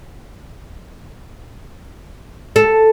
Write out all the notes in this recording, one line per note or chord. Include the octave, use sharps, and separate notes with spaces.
A4